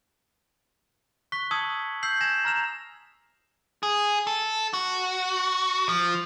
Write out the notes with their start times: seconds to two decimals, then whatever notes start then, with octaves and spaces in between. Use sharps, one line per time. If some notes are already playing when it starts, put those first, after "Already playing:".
1.32 C#6 F#6 B6 G7
1.51 A5 D#6 E6 G#6 C#7 F#7
2.03 E6 G6 C7 F#7
2.21 G#5 G#6 A#6 E7
2.45 A#5 F6 F7
3.83 G#4
4.27 A4
4.73 F#4
5.89 F3